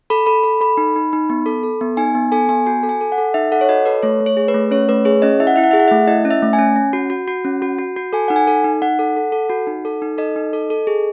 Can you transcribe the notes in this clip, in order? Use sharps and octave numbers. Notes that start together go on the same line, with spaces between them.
A4 B5
A4 B5
A4
A4 B5
D#4
D#4
D#4
B3
A4
A4
B3
D#4 G#5
B3
A4 G#5
B3 G#5
F#4 G#5
A4
G#5
A4
F#5
A4
D#4 E5
A4 F#5
C#5
F#4 D#5
A4 B4
A3 C#5
A3
C#5
G#4
B4
A3
C#4 C#5
A3 B4
G#4 C#5
C#4 D#5
E4 E5
F#5
E4 E5
F#5
G#4 E5
F#5
A3 E5
E4 D#5
C#4
E5
A3
G#5
C#4
C#4
F#4
F#4
F#4
C#4
F#4
F#4
F#4
A4 G#5
D#4 F#5
G#5
A4
D#4
D#4 F#5
A4
A4
A4
F#4
D#4
A4
D#4
A4 D#5
D#4
A4
A4
G#4